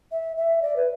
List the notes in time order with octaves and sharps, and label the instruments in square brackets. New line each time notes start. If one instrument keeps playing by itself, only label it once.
[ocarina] E5
E5
D5
B4